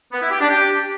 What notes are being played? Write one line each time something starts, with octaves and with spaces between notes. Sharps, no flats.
B3
E4
G4
D4
G4